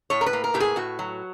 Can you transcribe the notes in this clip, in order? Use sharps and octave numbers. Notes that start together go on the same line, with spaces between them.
A2 C#5
A#4
B4
A#3
A#4
A2 G4
G#4
A2 F#4
F#3